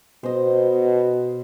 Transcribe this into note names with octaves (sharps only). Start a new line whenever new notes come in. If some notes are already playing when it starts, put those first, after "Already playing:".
B2 C5 D#5